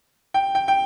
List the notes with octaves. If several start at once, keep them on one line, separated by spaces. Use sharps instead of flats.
G5
G5
G5